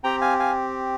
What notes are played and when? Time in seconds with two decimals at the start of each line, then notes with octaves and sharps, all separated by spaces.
0.04 C4 G4 G5 A#5
0.21 F5 G#5
0.39 F5 G#5